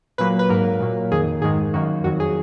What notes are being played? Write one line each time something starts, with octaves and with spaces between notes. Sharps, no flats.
A#2 F#3 A#3 B4
B4
G#2 F#3 A#3 A#4
A#2 F#3 A#3
F2 D#3 A#3 G#4
G#2 D#3 G#3 G#4
F#2 D#3 A#3 F#4
F2 D#3 F#3 F#4
G#4